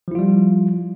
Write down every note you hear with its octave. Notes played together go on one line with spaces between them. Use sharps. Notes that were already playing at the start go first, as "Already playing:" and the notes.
F3 G3 E4 F4